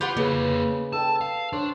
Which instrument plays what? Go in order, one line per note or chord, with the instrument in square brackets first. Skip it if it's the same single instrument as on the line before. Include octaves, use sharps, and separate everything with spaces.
[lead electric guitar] F4 [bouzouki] G4 B4 F#5
[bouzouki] C#3 [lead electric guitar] A#3 C#5 [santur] B4
[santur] A4 G5 [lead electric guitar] A5
[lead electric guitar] F5
[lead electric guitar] D4 [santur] C5 C#5